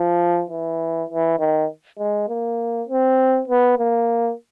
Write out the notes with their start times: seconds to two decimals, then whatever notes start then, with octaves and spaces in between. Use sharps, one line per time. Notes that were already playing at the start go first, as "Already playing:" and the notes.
Already playing: F3
0.50 E3
1.10 E3
1.39 D#3
1.99 G#3
2.28 A#3
2.89 C4
3.48 B3
3.78 A#3